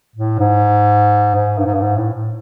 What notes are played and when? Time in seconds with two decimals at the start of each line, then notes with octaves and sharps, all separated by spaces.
0.16 A2
0.40 G#2
1.35 G#2
1.58 G2
1.66 G#2
1.74 G2
1.82 G#2
1.98 A2
2.14 A2